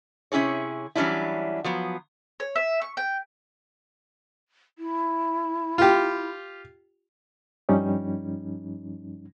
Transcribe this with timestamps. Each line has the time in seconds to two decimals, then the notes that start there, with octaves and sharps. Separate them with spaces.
0.32 C3 C#4 E4 G#4 C#5
0.95 E3 F#3 G3 C#4 D4 E4
1.64 F3 F#3 B3
2.40 C#5
2.56 E5
2.82 C#6
2.97 G5
4.79 E4
5.78 F4 G4
7.69 G2 F3 G3 C#4 D#4